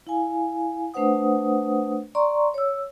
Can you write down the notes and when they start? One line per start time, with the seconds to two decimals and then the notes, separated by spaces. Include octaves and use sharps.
0.07 E4 F5 G#5
0.94 A3 D4 B4 C5 F#5 D#6
2.15 D5 A#5 C6 C#6
2.54 C#5 E6